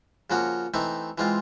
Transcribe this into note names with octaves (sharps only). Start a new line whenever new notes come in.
C#3 F3 A#3 C#4 F#4
E3 A3 C4 D#4
E3 G#3 C4 F4